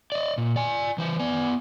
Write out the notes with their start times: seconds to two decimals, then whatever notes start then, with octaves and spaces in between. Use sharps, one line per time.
0.12 D5 D#5
0.38 A#2
0.56 D5 G#5
0.98 E3 C5
1.19 B3 D5 G#5